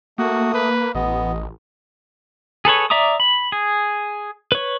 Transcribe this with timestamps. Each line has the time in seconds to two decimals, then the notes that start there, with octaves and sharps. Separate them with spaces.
0.18 A3 A#3 F#4 D#6
0.54 A#3 B4
0.95 A1 B3 D#5
2.65 G#4 A4 B4 C#5
2.90 D5 E5 A#5 D6 D#6
3.20 B5
3.52 G#4
4.52 B4 C#5